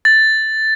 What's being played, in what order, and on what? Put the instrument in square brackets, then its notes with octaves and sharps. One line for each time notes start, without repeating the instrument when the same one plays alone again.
[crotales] A6